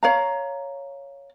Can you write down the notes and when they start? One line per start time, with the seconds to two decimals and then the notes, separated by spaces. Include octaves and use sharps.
0.03 C#5 F5 A#5